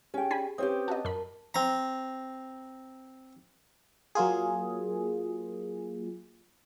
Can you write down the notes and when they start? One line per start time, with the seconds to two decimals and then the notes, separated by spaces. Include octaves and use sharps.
0.14 C#4 G4 G#4 G5
0.31 D4 G#5 B5
0.58 C4 C#4 G4 B4 C#5 D#6
0.88 F#4 D#5 A5 A#5
1.05 F#2 A#4 B5
1.54 C4 A#5
4.15 F#3 A#3 F4 G#4